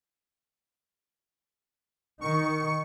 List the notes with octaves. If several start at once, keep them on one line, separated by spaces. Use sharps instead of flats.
D#3 C#6